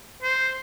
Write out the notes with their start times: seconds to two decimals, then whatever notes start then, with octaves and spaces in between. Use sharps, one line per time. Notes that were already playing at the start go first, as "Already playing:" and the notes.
0.22 C5